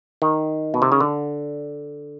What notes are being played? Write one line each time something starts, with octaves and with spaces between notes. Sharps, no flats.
D#3
B2
C3
C#3
D3